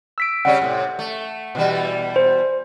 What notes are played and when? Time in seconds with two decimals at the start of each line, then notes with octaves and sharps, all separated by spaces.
0.18 E6 B6 D7
0.45 C#3 G3 C#4 F#5
0.62 A2 C3
0.99 A3
1.55 B2 E3 G3
2.16 C5